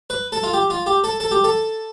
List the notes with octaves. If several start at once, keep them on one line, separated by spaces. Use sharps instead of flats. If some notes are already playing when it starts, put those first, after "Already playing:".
B4
A4
F4
G4
F4
G4
A4
A4
G4
A4